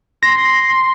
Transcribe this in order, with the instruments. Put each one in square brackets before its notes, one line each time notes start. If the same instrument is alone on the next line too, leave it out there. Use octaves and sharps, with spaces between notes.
[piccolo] C6 [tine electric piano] A#6